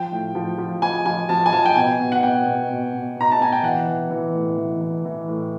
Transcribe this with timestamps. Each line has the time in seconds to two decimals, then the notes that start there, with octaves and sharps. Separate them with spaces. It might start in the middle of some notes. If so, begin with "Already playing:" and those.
Already playing: F3 G5
0.12 A2
0.35 F3
0.58 F3
0.82 F3 G#5
1.05 F3 G#5
1.29 F3 A5
1.46 G#5
1.53 F3 A5
1.65 G5
1.76 B2 G#5
2.00 B2
2.12 F#5
2.23 B2 G5
2.46 B2
2.69 B2
2.93 B2
3.17 B2 A#5
3.31 A5
3.39 B2 G#5
3.52 G5
3.63 E3 F#5
3.88 E3
4.10 E3
4.34 A2
4.57 E3
4.81 E3
5.05 E3
5.28 A2